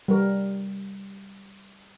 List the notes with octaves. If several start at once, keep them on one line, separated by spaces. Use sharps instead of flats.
G3 A#4